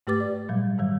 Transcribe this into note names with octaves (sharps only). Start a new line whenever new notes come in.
G#2 A3 G4 B4 D6 A6
D5
A#2 F#3 G3
G#2 D#3 F#3 G3